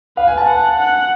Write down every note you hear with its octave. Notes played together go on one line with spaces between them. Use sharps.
B4 F5
G#5
A5
F#5
F#5